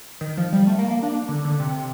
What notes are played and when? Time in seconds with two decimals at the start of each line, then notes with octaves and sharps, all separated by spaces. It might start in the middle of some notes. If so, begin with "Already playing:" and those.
0.21 D#3
0.37 F3
0.53 G3
0.67 A3
0.79 A#3
0.91 A#3
1.03 D4
1.29 D3
1.45 D3
1.60 C3